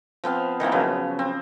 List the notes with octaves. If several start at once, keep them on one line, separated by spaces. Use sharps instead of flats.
F3 B3 C4 F5
D#3 E3 A#3 C4
C#3 F3 F#3 B3
C4